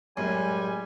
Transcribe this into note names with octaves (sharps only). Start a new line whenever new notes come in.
F#2 A2 G3 G#3 G#5